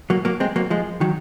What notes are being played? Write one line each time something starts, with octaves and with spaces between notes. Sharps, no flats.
F#3 A#3
F#3 A#3
G#3 C4
F#3 A#3
F3 G#3
D#3 F#3